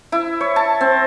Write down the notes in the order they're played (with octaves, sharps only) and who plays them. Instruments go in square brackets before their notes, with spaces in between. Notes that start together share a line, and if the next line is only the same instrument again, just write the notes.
[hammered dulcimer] E4
C#5
A5
C4